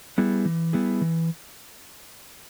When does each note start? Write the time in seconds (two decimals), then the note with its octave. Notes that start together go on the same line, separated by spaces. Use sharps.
0.18 G3 B3 E4 G#4
0.45 E3
0.73 G3 B3 E4 G#4
1.01 E3